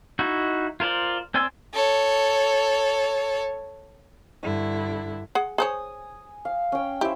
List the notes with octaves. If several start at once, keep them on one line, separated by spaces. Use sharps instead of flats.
D#4 E4 F#4
F4 A#4 C5 D5
C4 D5 G#5 C6 E6
A4 C#5
G2 D3 E4
G#4 F#5
G#4 C5 C#5 G#5 D#6
F5
C#4 G5
E4 G4 C5 E5